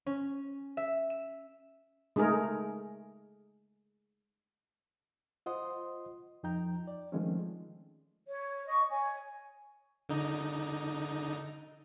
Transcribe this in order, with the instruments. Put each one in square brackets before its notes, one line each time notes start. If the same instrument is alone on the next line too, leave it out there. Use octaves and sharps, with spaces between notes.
[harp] C#4
E5
E7
[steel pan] G#3 A3 D#4 G#4 A#4
[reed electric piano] F4 C5 D#5 F#5 C6 D#6
F2 F3 D#4 G5 A#5 G6
D5
D#3 F3 G#3 A3 C4 C#4
[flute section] C#5
D#5 C#6
C#5 G#5
[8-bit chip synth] D3 D#4